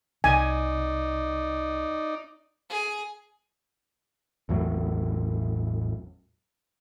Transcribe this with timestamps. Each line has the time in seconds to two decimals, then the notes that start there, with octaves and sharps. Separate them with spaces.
0.24 C2 D#4 D5 G#5
2.70 G#4
4.49 A1 E2 A2 F#3